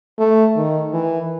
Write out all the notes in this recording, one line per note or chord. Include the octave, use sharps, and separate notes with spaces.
A3
D#3
E3